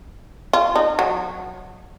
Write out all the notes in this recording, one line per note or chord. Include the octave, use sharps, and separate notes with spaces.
F4
D#4
F#3